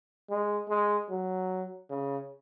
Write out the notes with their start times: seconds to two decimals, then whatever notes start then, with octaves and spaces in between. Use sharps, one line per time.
0.30 G#3
0.69 G#3
1.09 F#3
1.90 C#3